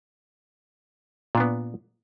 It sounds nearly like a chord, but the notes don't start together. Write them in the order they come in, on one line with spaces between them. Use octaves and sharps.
A#2 D4 B3